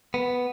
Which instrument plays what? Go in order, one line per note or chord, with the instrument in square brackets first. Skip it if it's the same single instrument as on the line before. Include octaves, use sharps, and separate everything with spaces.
[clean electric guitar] B3